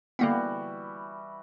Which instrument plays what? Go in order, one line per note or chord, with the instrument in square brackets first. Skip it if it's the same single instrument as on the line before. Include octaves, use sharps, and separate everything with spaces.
[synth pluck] D3 A#3 B3 [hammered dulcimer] E3 G3 F#4